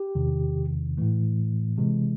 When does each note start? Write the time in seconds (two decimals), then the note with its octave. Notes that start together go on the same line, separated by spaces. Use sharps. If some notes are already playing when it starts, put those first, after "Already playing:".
Already playing: G4
0.15 E2 C3 D#3
0.97 A2 E3 A3
1.78 C3 E3 G#3